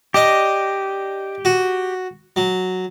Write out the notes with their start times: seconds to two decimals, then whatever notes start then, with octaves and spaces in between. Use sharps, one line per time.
0.14 D4 G4 D#5 D#6
1.45 F#4
2.36 F#3